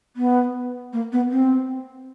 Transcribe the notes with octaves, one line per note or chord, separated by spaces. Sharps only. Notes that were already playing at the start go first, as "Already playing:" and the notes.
B3
A#3
B3
C4